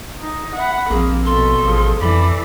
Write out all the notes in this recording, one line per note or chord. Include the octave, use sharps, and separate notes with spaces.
D#4
E5 F#5 B5
A#1 F3 A#3 C4 G#4
B2 A4 C6
A1 F3 G#4
F2 E3 A4 D5 B5